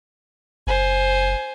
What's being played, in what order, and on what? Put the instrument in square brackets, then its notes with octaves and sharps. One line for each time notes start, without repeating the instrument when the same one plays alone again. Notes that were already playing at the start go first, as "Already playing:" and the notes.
[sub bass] F#1 [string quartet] C5 G#5